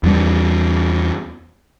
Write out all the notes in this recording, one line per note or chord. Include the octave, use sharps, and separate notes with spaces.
E2 G3